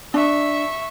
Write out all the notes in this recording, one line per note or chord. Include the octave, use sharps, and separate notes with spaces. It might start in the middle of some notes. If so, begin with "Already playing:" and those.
D4 E5 C#6